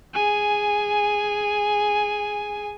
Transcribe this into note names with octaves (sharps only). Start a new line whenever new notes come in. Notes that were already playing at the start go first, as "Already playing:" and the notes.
G#4 G#5